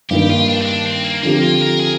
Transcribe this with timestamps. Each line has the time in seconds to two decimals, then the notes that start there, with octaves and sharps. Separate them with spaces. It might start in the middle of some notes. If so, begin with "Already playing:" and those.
0.10 G2 D#3 A#3 G4
0.29 F4
0.48 D4
0.62 C4
0.66 D4
0.86 C4
1.04 A#3
1.23 D3 F3 A#3 C4 G4
1.42 F4
1.61 A#4
1.79 G#4